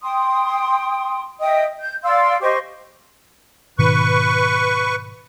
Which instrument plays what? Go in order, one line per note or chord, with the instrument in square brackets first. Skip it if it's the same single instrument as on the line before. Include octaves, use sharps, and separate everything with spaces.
[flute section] G5 C6 D#6
D#5 E5 G5 D#6
G6
D5 F5 C6 E6
G4 C5 D#5 C#6
[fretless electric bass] G#2 B2 D#3 [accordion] B4 C#6